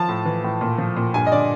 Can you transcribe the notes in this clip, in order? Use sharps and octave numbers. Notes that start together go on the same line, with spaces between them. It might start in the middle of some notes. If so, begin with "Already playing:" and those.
Already playing: F3 A5
A2
E3
A2
A#2
F3
A#2
G2 G#5
D#5
D3 D5